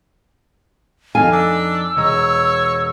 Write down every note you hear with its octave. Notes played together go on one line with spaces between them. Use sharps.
F2 D#4 A4 F5 G#5
D4 E6
E1 C#5 D#5 A#5